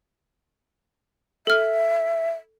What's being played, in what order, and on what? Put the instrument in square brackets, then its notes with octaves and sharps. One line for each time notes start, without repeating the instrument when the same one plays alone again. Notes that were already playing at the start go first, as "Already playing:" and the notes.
[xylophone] A4 F6 [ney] E5